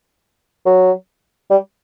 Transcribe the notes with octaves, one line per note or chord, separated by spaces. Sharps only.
F#3
G3